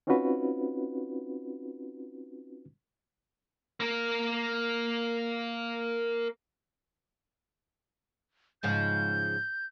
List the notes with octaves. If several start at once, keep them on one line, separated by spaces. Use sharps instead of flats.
C4 C#4 D#4 F4 F#4 B4
A#3 A#4
G#2 C#3 F3 G6